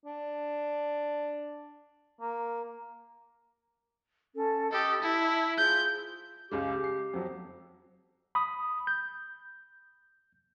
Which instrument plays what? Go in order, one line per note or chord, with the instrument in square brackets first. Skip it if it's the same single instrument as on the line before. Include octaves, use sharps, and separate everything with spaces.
[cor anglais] D4
A#3
[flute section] C#4 A4 A5
[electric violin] G4 A4 [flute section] D#5 B5 D#6
[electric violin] E4 [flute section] A5
[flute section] F4 G#4 C5 [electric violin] G6
[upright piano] C#2 C#3 G#3 [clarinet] G4
[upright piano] C7
F2 F#3
[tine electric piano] B5 D#6
G6